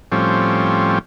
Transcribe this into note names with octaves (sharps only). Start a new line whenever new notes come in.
A2 F3 G3 C4 C#4